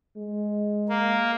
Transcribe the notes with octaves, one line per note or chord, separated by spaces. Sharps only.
G#3
A#3